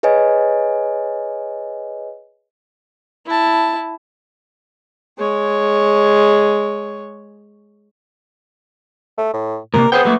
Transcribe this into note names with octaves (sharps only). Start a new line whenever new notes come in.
G#4 B4 C#5 D#5 G#5
E4 A5
G#3 C#5
A3
A2
A2 C3 A#3 A#4
B3 G#4 C5 G5
F#3 A3 A#3